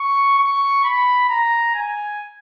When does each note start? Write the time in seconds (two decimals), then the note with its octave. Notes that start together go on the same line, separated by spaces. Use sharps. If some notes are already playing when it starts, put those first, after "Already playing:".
Already playing: C#6
0.39 C#6
0.84 B5
1.29 A#5
1.75 G#5